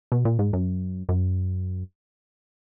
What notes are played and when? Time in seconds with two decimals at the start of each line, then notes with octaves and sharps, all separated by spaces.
0.12 B2
0.25 A#2
0.39 G#2
0.53 F#2
1.09 F#2